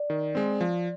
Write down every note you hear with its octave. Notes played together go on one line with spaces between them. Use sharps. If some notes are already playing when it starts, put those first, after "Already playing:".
Already playing: D5
D#3
G#3 C4
F3